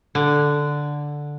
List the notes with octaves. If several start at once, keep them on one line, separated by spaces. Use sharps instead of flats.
D3